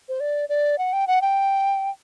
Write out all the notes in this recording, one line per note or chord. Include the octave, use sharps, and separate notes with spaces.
C5
D5
D5
F#5
G5
F#5
G5